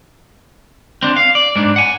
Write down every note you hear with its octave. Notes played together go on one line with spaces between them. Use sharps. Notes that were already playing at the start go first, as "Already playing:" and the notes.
C4 D4
F5
D5
G#2 D4
F#5 G#5